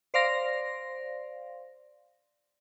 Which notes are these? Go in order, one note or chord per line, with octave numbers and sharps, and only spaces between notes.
C5 D5 F5 C6 A#6